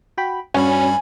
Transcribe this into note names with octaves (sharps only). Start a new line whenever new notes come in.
F#4 G5 B5
G2 G3 C#4 F#4 C#5 G#5 B5